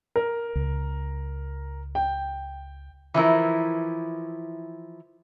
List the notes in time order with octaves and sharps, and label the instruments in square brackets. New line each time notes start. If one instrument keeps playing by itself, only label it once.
[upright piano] A#4
[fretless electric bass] C#2
[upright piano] G5
[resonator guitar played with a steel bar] E3 F3 E4 A#4